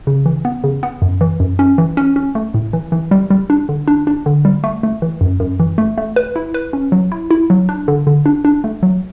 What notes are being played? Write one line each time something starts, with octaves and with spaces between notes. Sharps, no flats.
C#3
E3
B3
C#3
B3
F#2
E3
F#2
C#4
E3
C#4
C#4
A3
A2
E3
E3
G3
G3
D4
D3
D4
D4
D3
G3
A3
A3
E3
F#2
F#2
E3
A3
A3
B4
E4
B4
C#4
F#3
E4
E4
F#3
D4
D3
D3
D4
D4
A3
F#3